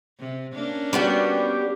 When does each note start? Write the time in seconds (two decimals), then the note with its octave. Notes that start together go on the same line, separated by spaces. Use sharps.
0.20 C3
0.54 A#3 C#4 D4
0.93 G3 B3 F#4 G4